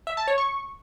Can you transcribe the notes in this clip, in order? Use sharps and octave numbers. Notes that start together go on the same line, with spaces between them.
E5
A5
C#5
C#6